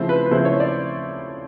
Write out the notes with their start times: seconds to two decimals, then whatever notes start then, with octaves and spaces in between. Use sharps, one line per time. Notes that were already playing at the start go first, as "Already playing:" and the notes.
Already playing: C#3 F3 A3 C4 E4 C5
0.09 B4
0.26 B4
0.31 C#3 F3 A3 C4 E4 C5
0.45 C#5
0.60 D5